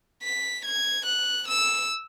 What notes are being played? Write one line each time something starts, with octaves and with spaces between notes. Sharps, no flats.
B6
G#6
F#6
E6